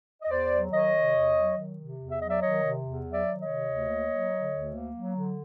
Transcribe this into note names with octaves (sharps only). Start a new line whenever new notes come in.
D#5
E2 C5 D5
F#3
D#3 C#5 D#5
C3
E2
F#3
D#3
C3
E2
E5
F#3 D#5
D5 E5
D#3 C#5 D#5
C3
E2
F#3
D5 E5
D#3
C#5 D#5
C3
D2
A#3
F#3
D3
D2
A#3
F#3
D3